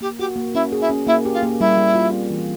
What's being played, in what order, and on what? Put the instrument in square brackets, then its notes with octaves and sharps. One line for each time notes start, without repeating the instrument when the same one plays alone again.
[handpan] A#3 [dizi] G4
[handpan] F#4 [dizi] G4
[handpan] A#3
[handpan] C#4 [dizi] E4
[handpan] G#4
[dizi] E4
[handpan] C#4
[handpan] A#3 [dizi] E4
[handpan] G4
[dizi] F4
[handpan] A#3
[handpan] G3 [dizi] E4
[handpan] G3
F4
C4
E3